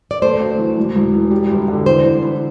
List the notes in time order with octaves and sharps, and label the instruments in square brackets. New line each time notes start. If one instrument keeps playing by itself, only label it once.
[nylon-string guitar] D5
[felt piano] A3 [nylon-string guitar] C5
[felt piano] D2
E3
E1
E1
E3
G3
G1
D3
[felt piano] E3 [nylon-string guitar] C5
[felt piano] E3
E4